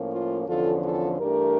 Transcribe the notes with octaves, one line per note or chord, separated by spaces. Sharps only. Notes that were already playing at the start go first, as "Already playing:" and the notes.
Already playing: A2 F3 A#3 C#4
F4
E2 D3 F3 C#4 F4 A4
F4 A4
G2 E3 A3 D4 G4 A#4